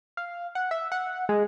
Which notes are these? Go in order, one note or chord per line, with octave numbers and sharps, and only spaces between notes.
F5
F#5
E5
F#5
G#3